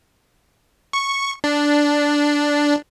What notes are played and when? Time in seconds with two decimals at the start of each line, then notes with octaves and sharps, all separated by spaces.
0.93 C#6
1.44 D4